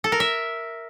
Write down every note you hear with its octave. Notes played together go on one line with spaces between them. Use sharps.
A4
A#4
E5